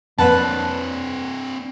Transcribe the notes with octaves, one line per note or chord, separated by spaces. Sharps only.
F2 A#3 C4 D4 B4 F#5 A5